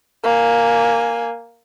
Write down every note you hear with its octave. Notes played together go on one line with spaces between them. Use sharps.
A#3 G#5